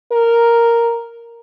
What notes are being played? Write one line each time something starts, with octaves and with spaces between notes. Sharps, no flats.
A#4